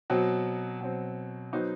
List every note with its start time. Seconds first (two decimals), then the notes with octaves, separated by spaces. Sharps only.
0.10 B2 F#3 C4
0.81 B2 F#3 C4
1.53 F#3 B3 D#4 F#4 C5